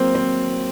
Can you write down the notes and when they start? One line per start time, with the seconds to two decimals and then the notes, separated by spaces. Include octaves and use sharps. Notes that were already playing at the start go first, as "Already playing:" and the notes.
Already playing: F#3 A#3 C4
0.15 C4